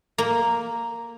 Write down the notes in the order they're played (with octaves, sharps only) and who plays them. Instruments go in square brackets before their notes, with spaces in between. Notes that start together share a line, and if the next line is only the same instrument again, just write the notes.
[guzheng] A#3